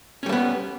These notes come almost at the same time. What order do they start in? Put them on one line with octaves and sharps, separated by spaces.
C#4 G3 A3 B3